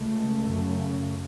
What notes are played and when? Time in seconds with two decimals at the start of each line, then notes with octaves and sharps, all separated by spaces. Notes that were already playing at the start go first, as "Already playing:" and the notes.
Already playing: C#2 C#3 A3
0.46 F#2 C#3